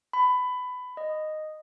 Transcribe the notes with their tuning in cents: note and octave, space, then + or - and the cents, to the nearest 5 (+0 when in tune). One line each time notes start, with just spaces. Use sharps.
B5 +20
D#5 -10